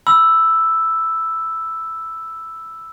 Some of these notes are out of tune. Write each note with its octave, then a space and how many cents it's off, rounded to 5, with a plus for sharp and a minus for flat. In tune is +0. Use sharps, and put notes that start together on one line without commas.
B5 +0 E6 +0